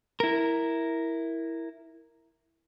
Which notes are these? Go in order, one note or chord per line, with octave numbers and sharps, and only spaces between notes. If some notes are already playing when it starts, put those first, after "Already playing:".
E4 A#4